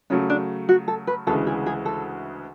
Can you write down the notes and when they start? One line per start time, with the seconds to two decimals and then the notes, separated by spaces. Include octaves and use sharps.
0.10 C#3 F#3 A3 C#4
0.30 D4
0.69 F#4
0.88 A4
1.07 B4
1.27 D2 C#3 E3 G#3 A4
1.47 G#4
1.66 G#4
1.86 A4